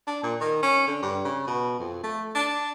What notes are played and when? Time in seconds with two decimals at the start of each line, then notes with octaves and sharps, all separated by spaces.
0.07 D4
0.23 A#2
0.41 D#3
0.63 C#4
0.87 D3
1.02 G2
1.25 C#3
1.47 B2
1.79 F2
2.03 A3
2.35 D4